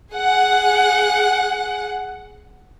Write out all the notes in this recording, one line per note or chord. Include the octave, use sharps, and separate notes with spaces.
G#4 F#5